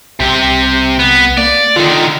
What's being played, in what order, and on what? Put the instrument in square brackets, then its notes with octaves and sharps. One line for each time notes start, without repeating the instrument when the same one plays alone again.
[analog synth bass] C2 [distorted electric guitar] C3 G4
[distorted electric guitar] B3
[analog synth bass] A#3 [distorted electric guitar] D5
[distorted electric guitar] D3 D#3 [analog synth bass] F4